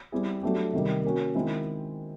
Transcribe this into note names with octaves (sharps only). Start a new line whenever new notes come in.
G3 C4 E4 G#4
F#3 A3 D4 G4
C3 D#3 G3
A#3 C#4 F#4
D#3 G#3 C4 E4